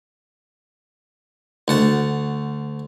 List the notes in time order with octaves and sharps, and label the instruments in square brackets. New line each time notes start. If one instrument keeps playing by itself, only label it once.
[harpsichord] D2 F#5 A5